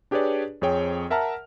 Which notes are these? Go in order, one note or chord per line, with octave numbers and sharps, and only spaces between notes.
D4 G4 G#4 B4 C#5 D5
F2 C4 G#4 C#5 G5
A#4 E5 F#5 A5 A#5 F6